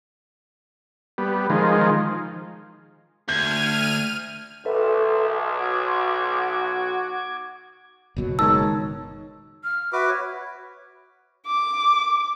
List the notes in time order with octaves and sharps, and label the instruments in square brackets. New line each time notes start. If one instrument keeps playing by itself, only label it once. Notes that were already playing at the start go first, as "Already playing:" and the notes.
[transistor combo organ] G3 B3
D#3 F3 G#3
[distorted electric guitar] D2 [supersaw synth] F6 D#7 [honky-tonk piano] G6 [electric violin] G#6
[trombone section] B1 [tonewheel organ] A4 B4 E5
[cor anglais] F#4 [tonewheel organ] D6 G#6
[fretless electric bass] F#1 B2 F#3
[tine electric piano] D#3 D#4 C#5 [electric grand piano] G#3 A5 [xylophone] E6
[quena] F6
[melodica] F#4 B4 D6 [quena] E5
[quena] C#5
[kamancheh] D6